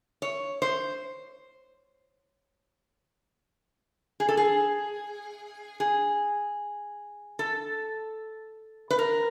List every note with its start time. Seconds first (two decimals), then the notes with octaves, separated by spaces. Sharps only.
0.22 C#5
0.62 C5
4.20 G#4
4.29 A4
4.37 G#4
5.80 G#4
7.39 A4
8.90 B4
8.99 A#4